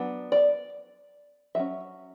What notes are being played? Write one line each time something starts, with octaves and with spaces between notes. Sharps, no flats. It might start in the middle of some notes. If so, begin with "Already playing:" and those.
Already playing: F#3 B3 D4
D5
F#3 C#4 E5